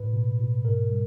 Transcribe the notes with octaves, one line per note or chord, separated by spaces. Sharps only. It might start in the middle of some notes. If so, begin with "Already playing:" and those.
Already playing: A2 B4
B2
B2
G#2 A#4
G3